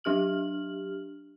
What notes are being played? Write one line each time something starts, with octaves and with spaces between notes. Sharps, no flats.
F#3 D4 G4 F6 F#7